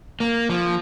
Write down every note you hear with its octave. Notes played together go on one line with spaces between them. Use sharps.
A#3
F3